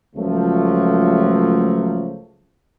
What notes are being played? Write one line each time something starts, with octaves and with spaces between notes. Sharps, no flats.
C#2 F3 F#3 A3